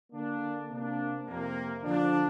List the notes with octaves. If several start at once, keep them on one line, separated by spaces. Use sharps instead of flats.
D3 A#3 D4
C3 A#3 D4
F2 C3 A#3
D3 F3 D4